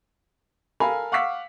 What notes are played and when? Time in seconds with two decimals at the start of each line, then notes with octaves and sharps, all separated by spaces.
0.80 A4 A#4 F5 G#5 A#5 B5
1.12 F5 F#5 C#6 D6 E6 B6